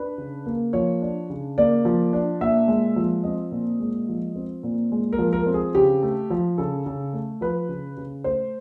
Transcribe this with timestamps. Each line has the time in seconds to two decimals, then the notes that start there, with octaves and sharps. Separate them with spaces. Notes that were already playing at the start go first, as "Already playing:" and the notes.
Already playing: D4 B4
0.18 C#3
0.46 A#3
0.73 F3 C#5
1.02 D4
1.30 C#3
1.58 A#3 D5
1.85 F3
2.13 D4
2.41 A#2 E5
2.68 G#3
2.96 F3
3.24 C4 D#5
3.52 A#2
3.80 G#3
4.08 F3
4.36 C4
4.63 A#2
4.92 G#3
5.13 A#4
5.18 F3
5.33 A#4
5.46 C4
5.54 G#4
5.75 C#3 G4
6.02 A3
6.30 F3
6.58 C#3 A4
6.86 C#3
7.13 A3
7.41 F3 B4
7.69 C#3
7.97 C#3
8.24 A3 C5